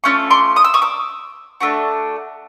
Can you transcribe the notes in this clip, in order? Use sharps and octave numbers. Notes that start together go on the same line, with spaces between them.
A3 C#4 F4 C#6
C6 D6
D#6
E6
C#6 D#6
D6 E6
A3 D4 F#4